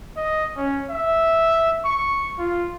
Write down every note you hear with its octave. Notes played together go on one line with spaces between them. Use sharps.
D#5
C#4
E5
C#6
F4